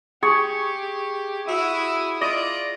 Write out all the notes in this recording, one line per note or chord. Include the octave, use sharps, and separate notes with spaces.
G4 G#4 C#6
E4 F#4 E5 D#6
F4 D5 D#5